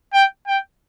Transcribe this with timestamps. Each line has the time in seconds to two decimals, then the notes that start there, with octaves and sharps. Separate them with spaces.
0.14 G5
0.47 G5